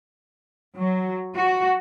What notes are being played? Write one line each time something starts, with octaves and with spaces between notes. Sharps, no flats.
F#3
F#4